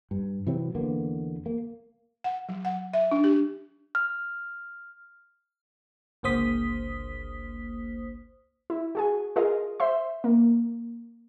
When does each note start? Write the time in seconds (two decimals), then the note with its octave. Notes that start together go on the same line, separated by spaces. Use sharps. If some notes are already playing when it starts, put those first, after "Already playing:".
0.11 G2
0.47 C3 E3 F#3 C4
0.75 E2 D3 A#3 B3
1.46 A#3
2.24 F#5
2.49 F#3
2.65 F#5
2.94 E5
3.11 D4
3.24 G4
3.95 F6
6.23 G1 C#2 A#3 C5 D#6 B6
8.70 E4
8.95 F#4 G#4 G#5
9.36 F4 G#4 A#4 D#5 F5
9.80 C5 E5 C6
10.24 A#3